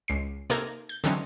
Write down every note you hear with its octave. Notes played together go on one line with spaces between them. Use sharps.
C#2 C7
C3 A#3 D#4 A4 A#4 G#6
G6
D3 E3 F#3 C4 C#4 D#4